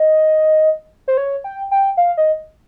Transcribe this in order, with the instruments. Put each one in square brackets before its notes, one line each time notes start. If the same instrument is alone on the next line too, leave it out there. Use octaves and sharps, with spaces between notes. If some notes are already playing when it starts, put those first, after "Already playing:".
Already playing: [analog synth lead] D#5
C5
C#5
G5
G5
F5
D#5